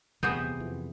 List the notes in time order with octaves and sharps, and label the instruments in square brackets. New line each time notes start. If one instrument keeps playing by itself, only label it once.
[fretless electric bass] D#1 E2 [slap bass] C3 [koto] B3 F#4 G#4 [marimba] G6
[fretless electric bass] F2 E3